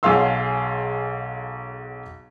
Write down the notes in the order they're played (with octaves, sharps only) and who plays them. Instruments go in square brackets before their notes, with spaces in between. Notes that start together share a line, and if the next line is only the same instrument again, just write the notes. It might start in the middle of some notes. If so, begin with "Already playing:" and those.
[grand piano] B1 F#3 G#4 F5 C6 E6